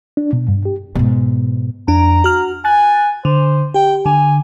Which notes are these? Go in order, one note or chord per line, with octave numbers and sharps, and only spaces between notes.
D4
B2
G2
G4
G#2 B2
F2 D4 A#5
F#4 F6
G#5 F#6 A6
D3 C5
G4 G5
D3 G#5